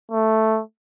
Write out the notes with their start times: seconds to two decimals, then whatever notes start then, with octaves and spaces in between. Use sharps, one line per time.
0.12 A3